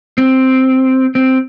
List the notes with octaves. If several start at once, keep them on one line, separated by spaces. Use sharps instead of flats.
C4
C4